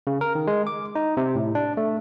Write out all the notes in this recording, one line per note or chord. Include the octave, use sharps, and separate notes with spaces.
C#3
A#4
D#3
G#3
D6
D#4
C3
A2
D4
A3